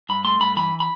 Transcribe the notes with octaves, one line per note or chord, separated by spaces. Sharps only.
G2 B5
A3 C6
G2 B5
E3 B5
B5